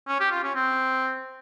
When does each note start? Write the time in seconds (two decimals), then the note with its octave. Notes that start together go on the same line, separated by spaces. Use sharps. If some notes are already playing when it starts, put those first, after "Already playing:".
0.08 C#4
0.20 G4
0.32 F4
0.44 C#4
0.55 C4